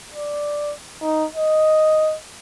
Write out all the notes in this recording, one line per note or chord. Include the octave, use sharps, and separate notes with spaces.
D5
D#4
D#5